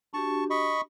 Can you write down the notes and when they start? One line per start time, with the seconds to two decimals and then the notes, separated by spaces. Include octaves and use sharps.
0.14 D4 F#4 G4 A5 C#6
0.50 D#5 B5 C#6